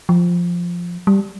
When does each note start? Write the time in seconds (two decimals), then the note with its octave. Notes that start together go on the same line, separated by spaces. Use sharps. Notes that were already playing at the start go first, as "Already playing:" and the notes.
0.09 F3
1.07 G3